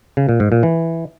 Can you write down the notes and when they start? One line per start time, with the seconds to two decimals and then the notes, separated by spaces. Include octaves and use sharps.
0.17 C#3
0.29 A#2
0.40 G#2
0.52 A#2
0.63 E3